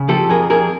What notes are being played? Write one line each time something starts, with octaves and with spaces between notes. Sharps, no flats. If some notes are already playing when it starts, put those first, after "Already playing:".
Already playing: C#3
F3 G4 A4
F2 G#4 A#4
F2 G#4 A#4